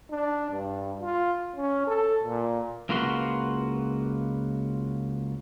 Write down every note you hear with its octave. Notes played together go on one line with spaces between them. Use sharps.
D4
G2
F4
C#4
A4
A#2
C#2 A#3 F4 F#4 B4 C6